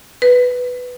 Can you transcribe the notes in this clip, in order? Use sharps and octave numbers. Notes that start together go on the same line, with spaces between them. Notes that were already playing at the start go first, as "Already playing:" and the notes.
B4